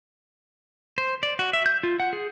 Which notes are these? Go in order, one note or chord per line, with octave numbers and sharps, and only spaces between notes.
C5
D5
F#4
E5
G6
F4
F#5
G#4